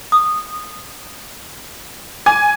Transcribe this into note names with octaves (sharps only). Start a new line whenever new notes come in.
D#6
G#5 D6